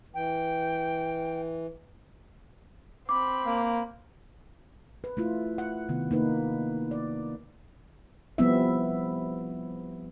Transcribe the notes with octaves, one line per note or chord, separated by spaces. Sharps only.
E3 G5
C4 B5 D6
A#3
B4
A3 E4 F4
F#5
C3 D#3 B3
A#3 D#4 B4
D5
F3 G3 B3 C4 E4 E5